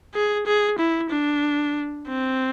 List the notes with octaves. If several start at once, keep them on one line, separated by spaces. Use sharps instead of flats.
G#4
G#4
E4
D4
C4